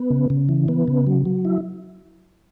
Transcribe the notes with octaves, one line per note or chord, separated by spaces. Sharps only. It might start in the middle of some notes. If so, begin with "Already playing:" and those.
Already playing: B3
C#3
C#3
E3
B3
C#3
F#3
F#3
E4